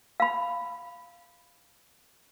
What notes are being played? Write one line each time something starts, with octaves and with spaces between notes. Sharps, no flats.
F5 B5